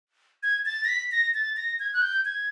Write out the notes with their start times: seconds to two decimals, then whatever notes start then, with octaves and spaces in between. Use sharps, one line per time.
0.43 G#6
0.66 A6
0.84 A#6
0.88 B6
1.12 A#6
1.34 A6
1.57 A#6
1.80 G#6
1.94 F#6
2.02 G6
2.25 G#6